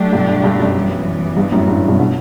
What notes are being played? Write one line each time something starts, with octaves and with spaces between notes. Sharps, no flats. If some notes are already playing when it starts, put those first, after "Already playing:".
Already playing: F#3 A3 D4 G4
G2 B2
G2
G2
F#2
E3 G3 B3
G2
F#2 A2
G2
G2 B2
B2